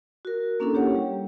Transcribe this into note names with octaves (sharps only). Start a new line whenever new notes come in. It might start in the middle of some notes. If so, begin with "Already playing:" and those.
F#4 A#4
A#3 C#4 D4 E4 A4
G4 C#5 F#5
G3